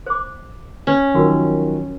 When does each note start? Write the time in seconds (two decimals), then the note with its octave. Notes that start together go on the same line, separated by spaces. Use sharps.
0.06 C5 D6
0.87 C#4
1.14 D#3 F3 F#3 D#4 F#4 A#4